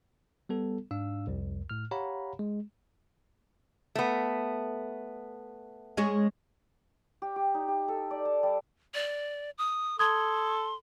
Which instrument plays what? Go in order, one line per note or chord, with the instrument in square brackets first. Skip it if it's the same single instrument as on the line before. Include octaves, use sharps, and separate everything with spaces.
[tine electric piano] G3 B3 A4
G#2 D4 F5 E6
C2 F2
A2 F6
G4 C#5 F5 F#5 A#5 B5
G#3
[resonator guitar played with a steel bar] A3 B3
[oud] G#3 C#4 G#4
[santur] G4
G4
D#4
G4
A4
D5
A5
G3
[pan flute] D5
D#6
[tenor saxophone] A4 [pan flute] C6 [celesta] D#6 G#6